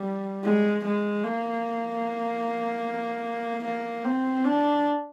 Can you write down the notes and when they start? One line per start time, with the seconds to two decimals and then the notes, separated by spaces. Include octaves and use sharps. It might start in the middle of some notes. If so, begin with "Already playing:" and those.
Already playing: G3
0.44 G#3
0.84 G#3
1.24 A#3
3.64 A#3
4.04 C4
4.44 D4